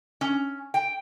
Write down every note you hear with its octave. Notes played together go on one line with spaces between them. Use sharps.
C#4
G5